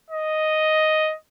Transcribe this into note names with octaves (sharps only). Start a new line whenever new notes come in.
D#5